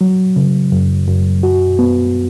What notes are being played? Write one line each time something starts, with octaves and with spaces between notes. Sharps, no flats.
F#3
C#3
F#2
F#2
F#4
B3